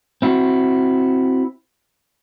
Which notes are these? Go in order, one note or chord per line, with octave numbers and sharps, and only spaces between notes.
C4 E4 F#4